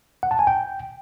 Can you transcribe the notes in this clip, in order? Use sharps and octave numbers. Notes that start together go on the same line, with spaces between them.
F#5
A5
G#5
G5